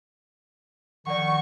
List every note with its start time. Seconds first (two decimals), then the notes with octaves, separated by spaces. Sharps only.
1.07 D#3 F3 D5 F#5 C#6